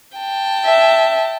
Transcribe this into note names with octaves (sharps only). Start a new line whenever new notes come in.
G5 A5
E5